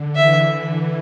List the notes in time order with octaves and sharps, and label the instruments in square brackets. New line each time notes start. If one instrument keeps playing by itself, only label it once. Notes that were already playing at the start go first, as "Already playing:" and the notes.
Already playing: [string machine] D3
[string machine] E3 [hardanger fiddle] E5